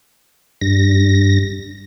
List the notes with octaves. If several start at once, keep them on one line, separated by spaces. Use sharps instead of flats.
G2 A#6